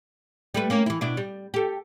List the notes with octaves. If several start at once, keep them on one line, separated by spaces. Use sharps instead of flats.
G3 A3 B4
A#3 C#4
E3 E4
B2 D4 E4
G3
G4 A4